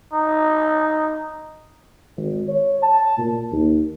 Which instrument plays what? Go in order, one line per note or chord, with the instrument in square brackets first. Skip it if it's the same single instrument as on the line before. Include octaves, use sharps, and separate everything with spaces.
[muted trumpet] D#4
[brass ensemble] G#1
C#5
A5
A#2
D#2